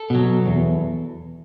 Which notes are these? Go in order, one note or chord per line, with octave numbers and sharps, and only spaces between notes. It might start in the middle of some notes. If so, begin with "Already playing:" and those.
Already playing: A4
B2 F#3
E2